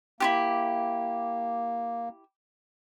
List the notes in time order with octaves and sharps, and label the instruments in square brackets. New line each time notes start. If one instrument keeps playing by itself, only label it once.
[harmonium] A#3 [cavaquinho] E4 F4 G4